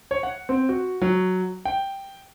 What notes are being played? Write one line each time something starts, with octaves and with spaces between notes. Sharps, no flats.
C#5
F#5
C4
F#4
F#3
G5